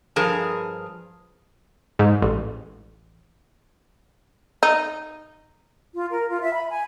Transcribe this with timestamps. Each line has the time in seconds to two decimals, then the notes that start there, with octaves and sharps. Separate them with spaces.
0.16 G2 F3 G#4 A#4 A5
1.99 G#2
2.22 A1
4.63 D#4
5.94 F4
6.11 A#4
6.29 F4
6.41 E5
6.54 B5
6.71 G#5